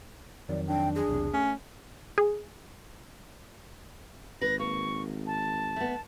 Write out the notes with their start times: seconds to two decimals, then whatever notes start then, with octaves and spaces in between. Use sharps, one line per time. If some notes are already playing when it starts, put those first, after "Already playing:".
0.49 F2 D#3 F#3 D5
0.67 D4 G5
0.95 G#4
1.08 B1 E2 C3
1.33 A3 C#4
2.18 G#4
4.42 G#1 B4 A#6
4.59 A#3 C#6
5.27 A5
5.76 A3 B3